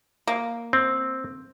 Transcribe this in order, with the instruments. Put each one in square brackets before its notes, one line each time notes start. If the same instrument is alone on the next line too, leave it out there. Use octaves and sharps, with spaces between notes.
[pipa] A#3
[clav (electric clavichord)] C4